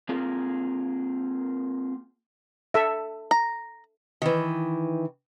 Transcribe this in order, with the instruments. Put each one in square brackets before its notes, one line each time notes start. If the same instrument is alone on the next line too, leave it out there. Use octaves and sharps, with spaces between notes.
[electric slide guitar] A#3 C4 F4 G#4 A#4
[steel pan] A4 E5
[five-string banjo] A#5
[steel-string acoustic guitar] D#3 E3